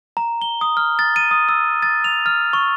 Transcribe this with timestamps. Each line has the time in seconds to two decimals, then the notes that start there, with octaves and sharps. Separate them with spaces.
0.17 A#5
0.42 G7
0.61 D#6
0.77 F6
0.99 A6
1.16 D#7
1.31 D#6
1.49 E6
1.83 A6
2.04 F7
2.26 F6
2.53 C#6